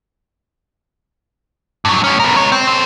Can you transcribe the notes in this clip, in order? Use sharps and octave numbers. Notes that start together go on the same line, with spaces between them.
G2 F#3
A2 C#4
B3 A#4
G#3 C#5
C4
A4 C5